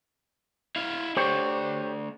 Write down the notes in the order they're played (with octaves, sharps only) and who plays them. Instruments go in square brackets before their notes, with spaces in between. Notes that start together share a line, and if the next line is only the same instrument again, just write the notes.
[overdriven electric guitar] E4 F5
[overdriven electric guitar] A3 D4 [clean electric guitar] G4 C5 C#5